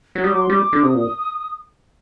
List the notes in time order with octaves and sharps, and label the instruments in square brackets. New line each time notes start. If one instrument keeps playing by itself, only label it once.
[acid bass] F#3
[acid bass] G3 [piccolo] D#6
[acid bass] F#3 [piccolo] D6
[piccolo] C6
[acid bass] G3 [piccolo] D6
[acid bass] D3
[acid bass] C3 [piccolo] D#6
[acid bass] A#2